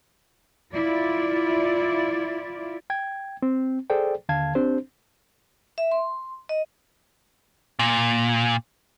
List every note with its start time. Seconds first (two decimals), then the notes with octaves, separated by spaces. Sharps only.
0.72 E4 F4 D5
2.90 G5 G#6
3.43 C4
3.90 G#4 A4 C5 D5 G5
4.29 D#2 D3 F5 A5 G#6
4.55 C4 D4 G4 C5
5.78 E5
5.91 C6
6.49 D#5
7.79 A#2